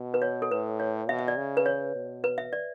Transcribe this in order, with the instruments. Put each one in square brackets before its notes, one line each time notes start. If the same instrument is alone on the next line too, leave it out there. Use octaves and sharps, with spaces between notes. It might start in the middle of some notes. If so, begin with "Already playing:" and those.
Already playing: [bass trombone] B2
[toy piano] B4
C#5
A4
[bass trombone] A2 [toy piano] B4
[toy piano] C#5
[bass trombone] B2 [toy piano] E5
[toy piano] E5
D5
[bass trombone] C#3
[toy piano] B4
C#5
[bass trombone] B2
[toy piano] B4
E5
D5